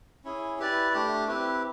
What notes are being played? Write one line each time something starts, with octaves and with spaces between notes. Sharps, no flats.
C#4 E4 G#4
E4 G4 B4 D5
A3 D4 G4
C4 E4 G4 B4